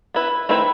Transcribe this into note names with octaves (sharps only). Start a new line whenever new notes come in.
B3 E4 B4
D#3 A3 C4 E4 B4